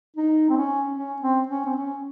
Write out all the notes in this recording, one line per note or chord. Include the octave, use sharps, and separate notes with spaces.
D#4
C4
C#4
C#4
C4
C#4
C4
C#4